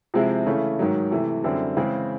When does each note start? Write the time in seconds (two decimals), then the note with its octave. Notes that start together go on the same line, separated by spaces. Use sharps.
0.14 C3 F3 G#3 C4 E4
0.46 C#3 E3 A3 C#4
0.79 G#2 D#3 F#3
1.11 C3 E3 A3
1.44 F#2 D3 G3 C4 E4
1.77 C#3 E3 G#3 C4 E4